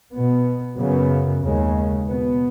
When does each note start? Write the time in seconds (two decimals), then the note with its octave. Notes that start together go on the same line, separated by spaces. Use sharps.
0.12 B2 B3
0.77 F#2 C#3 B3
1.42 D#2 C#3 G#3
2.07 B2 B3